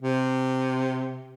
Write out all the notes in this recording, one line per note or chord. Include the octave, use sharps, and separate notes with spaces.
C3